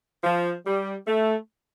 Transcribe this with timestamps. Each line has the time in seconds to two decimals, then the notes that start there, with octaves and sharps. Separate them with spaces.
0.24 F3
0.65 G3
1.07 A3